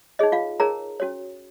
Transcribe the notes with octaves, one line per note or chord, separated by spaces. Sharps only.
D#4 G#4 C#5 D#5
F4 F5
D#4 G#4 A#4 C#5 A#5
C#4 F#4 C#5